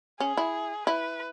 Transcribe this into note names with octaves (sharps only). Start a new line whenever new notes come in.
C#4 G#4
E4
E4 B4